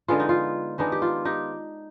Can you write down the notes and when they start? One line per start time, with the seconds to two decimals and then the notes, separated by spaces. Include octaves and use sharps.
0.08 D3 G#3 B3 F4
0.20 D#4
0.29 F4
0.78 D#3 G#3 B3 D4 D#4
0.92 G4
1.02 F4
1.25 D#4 G4